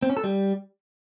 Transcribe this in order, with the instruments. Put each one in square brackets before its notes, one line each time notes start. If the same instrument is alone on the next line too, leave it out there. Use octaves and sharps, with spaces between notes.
[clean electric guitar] C4
C#4
A4
G3